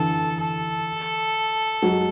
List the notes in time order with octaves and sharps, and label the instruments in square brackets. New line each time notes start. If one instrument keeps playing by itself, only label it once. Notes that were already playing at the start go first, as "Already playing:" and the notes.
Already playing: [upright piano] D3 E3 [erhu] A4
[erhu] A4
[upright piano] F#3 G#3